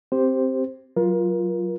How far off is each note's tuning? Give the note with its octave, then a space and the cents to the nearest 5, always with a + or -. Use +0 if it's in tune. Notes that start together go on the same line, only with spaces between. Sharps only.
C4 +0 G4 +0 C5 +0
F#3 +0 F4 +0 A#4 +35